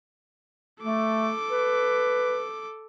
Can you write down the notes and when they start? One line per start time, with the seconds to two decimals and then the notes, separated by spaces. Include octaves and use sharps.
0.82 A3 A4 D6
1.50 B4